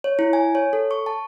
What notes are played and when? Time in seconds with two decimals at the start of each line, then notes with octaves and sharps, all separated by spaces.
0.04 C#5
0.19 E4
0.33 G#5
0.55 C#5
0.73 A4
0.91 C#6
1.06 A5